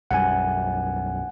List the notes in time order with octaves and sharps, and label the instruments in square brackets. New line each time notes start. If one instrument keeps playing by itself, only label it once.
[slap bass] B1 F#2 G3 [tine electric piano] F#5 G#5